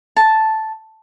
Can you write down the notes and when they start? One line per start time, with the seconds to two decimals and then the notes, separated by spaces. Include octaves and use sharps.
0.16 A5